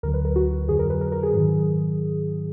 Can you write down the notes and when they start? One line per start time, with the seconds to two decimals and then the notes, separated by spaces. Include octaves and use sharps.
0.03 D2 D3 F#3 A#4
0.14 B4
0.25 A#4
0.36 F#4
0.69 F2 D3 F#3 G#4
0.79 A#4
0.90 B4
1.01 A#4
1.12 A#4
1.23 G#4
1.33 G#2 D#3 F#3